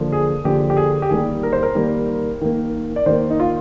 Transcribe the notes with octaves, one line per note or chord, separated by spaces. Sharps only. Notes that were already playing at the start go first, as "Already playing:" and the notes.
Already playing: D3 F3 A#3
G#4
D3 F3 A#3 G4
G4
G#4
G4
D#3 G3 A#3 G#4
A#4
C5
A#4
D#3 G3 A#3
D#3 A#3
D5
D#3 A#3 C5
D#4
F4